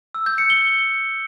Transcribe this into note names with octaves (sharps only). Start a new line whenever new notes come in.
E6
G6
C#7
G7